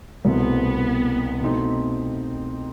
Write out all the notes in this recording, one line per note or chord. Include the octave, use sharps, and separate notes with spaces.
C2 B2 A3 B3 C4
B2 A3 C4 D#4